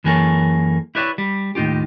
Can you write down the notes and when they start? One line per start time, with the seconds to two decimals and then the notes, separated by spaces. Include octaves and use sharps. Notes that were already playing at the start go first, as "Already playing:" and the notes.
0.04 F#2 E3 A#3 G#4 A4 C#5
0.95 E4 G4 B4 C#5 D5 E5
1.18 G3
1.55 D#2 A2 D#4 F4 G4